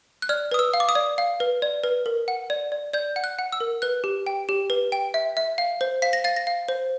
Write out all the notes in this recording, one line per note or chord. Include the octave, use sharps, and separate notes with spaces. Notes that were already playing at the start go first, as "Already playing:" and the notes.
F#6
D5 F6
B4 D#6
E6
F5
D6
D#6
D5
F5
B4
D5
B4
A#4
F#5
D5
D5
D5 G6
F#5
F#6
F#5
E6
A#4
B4 F#6
G4
G5
G4
B4
G5
E5
E5
F5
C5
F5 B6
A#6
F5 A6
A#6
F5
C5